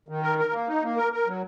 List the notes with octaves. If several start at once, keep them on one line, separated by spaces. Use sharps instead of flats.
D#3
A#4
A#4
A#3
D#4
A#3
A#4
A#4
F#3